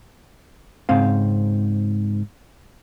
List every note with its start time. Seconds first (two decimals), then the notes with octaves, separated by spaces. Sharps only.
0.89 G#2 C#3 C4 F5